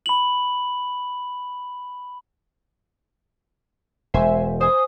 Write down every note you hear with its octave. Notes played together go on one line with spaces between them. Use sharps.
B5 F#7
E1 G#3 C5 E5 G#5
C5 G#5 D#6